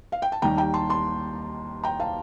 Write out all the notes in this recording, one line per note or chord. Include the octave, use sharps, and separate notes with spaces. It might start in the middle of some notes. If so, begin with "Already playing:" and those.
F5
G5
A5
D#2 D#3 G3 G5 A#5
G5 A#5
A5 C6
A5 C6
G5 A#5
F5 A5